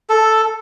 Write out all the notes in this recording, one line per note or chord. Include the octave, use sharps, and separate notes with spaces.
A4